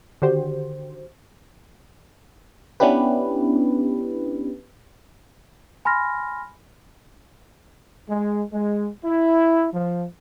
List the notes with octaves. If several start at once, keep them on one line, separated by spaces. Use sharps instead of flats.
D3 D#3 F#4 G4 C5
B3 C#4 D4 E4 G4 B4
G#5 B5 C6 F6 A#6
G#3
G#3
E4
F3